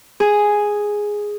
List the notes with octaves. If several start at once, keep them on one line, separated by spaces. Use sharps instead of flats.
G#4